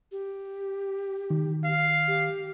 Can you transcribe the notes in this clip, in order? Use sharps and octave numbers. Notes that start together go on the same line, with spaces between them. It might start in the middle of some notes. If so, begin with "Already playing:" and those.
G4
D#3
F5
G4